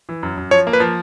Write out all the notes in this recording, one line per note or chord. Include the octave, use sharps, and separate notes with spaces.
E3
F#2
F#2
F3 C#5
A#3
B4
F3